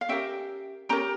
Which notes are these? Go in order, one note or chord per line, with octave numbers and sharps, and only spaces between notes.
F5
C#4 G4 A#4 E5 G5
C#4 G4 A#4 G5 A#5